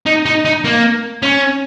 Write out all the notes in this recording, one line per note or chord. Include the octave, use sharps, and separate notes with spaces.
D#4
D#4
D#4
A#3
C#4